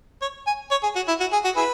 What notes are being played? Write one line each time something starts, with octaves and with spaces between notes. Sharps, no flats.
C#5
G#5
C#5
G#4
F#4
E4
F#4
G#4
F#4
E4 G#4 B4